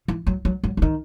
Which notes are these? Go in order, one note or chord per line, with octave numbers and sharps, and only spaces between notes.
E3
F#3
F#3
F#3
E3
D#3